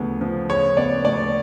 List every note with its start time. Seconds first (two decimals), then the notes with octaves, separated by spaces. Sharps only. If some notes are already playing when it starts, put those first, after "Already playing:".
Already playing: D2 C#3 F3 B3
0.21 F3
0.49 C#3 C#5
0.77 B3 D5
1.05 D2 D5